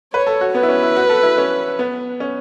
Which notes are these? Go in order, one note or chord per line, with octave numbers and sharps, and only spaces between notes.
B4 C#5
A4
F#4
B3 B4
E4
C#4
E4
F#4
A4
E4
C#4
B3
C#4